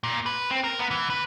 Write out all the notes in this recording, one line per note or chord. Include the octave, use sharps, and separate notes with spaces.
A#2
B4
C4
A#4
B3
E3
B4